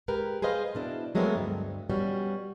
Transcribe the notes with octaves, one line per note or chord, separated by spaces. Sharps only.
G#3 G4 A#4 B4
G#4 B4 C5 D#5 F5
B2 D4 E4
F#3 G#3 A3 B3 C4 A#4
D2 G2
B2 G3 C#4 F#4